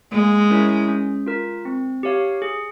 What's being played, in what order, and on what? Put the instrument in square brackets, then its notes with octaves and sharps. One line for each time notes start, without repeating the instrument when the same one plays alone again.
[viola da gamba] G#3 [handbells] A#3
[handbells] C#4 E4 A#4 C#5
C#4
F4 A#4
C4
G4 C#5 F5
G#4